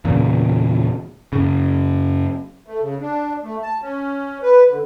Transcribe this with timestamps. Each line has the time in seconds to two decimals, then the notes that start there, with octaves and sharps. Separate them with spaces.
0.05 E2 A#2 C#3
1.33 F#2 C#3
2.67 A3
2.80 C#3
3.00 D4
3.43 A3
3.62 A5
3.82 C#4
4.42 B4
4.68 D3